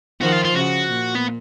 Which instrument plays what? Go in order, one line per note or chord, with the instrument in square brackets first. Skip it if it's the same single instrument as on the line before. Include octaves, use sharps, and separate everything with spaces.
[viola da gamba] D#3 F3 [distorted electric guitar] F#4
[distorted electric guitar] F4
F4
[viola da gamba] C#3 [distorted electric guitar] F#4
[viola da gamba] A#2
[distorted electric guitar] B3